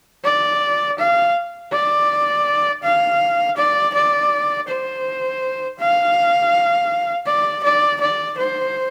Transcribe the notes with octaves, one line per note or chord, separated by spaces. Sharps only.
D5
F5
D5
F5
D5
D5
C5
F5
D5
D5
D5
C5